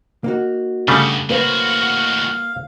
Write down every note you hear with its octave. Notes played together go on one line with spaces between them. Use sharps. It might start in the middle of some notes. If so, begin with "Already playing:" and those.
A#3 D#4 F#4
G2 C#3 G3 A3 B3
A2 A#3 F#4 B4 C5 F5